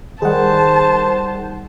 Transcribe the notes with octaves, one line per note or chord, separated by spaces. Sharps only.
D#3 G3 G#4 C5 F#5 A5